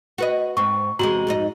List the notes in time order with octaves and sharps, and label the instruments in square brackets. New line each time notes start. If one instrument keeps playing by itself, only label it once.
[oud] F#4 B4 D#5
[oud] G#2 C4 [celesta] C#6
[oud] E2 C3 G#3 [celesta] F#4 A#5 F#7
[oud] F2 G#2 D#4